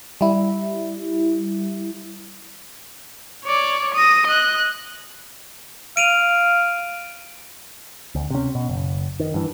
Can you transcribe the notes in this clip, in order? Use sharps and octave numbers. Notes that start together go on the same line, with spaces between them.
G3 E4
C#5 D5
D#6 A#6
D#5 F#6
F5 D7 D#7 F7
D2
C3 C#4
B2
F#1
D#3
G2 E3